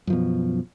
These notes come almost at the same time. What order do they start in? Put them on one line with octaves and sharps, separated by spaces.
F#2 F3 B2